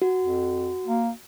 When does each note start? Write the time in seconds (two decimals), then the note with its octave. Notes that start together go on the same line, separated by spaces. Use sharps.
0.02 F#4
0.20 F2
0.87 A#3